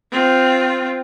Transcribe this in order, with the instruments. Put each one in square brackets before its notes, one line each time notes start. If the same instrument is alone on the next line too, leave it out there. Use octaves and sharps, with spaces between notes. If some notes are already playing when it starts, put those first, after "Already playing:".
[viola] C4 F4